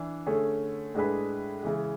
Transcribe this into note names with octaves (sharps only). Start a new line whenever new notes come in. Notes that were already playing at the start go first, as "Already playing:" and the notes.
Already playing: E3 D4
D3 A3 C#4 G#4
A2 G#3 D4 G#4 B4
C#3 E3 G#3